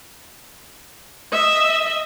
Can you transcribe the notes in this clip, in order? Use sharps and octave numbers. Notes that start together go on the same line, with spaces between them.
D#5 E5